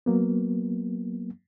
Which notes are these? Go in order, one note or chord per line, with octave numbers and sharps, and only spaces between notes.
F#3 A#3 B3